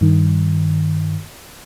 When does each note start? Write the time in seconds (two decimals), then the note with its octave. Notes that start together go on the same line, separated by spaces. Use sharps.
0.01 G2 D#3